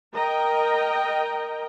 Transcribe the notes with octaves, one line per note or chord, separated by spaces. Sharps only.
A#4 D#5 G5 A#5